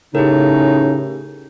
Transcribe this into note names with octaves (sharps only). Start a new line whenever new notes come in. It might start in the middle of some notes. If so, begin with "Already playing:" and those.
A2 C#3 D#4 G4 A#4